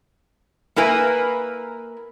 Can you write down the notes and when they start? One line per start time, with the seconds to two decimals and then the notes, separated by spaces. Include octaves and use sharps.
0.76 A#3 E4 A#4 B4 G#5